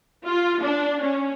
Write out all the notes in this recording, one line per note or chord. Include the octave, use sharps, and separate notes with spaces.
F4
D4
C#4